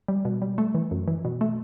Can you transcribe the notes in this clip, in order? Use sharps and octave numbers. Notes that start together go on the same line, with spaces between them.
G3
B2
G3
A3
E3
F#2
E3
B2
A3